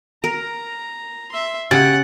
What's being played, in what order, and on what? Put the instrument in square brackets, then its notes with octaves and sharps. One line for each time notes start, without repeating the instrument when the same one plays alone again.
[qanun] A#4 [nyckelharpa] A#5
[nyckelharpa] E5 C6
[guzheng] C#3 [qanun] G4 [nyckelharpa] F#5 [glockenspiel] A6